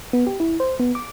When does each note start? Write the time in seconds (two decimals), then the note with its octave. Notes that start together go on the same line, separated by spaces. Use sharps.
0.13 B3
0.27 G4
0.40 E4
0.60 C5
0.80 B3
0.95 D6